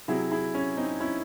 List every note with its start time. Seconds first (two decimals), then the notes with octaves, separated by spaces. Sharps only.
0.08 C3 F#3 E4 G#4
0.32 E4 G#4
0.55 C#4
0.77 C4 D#4
1.00 C#4 E4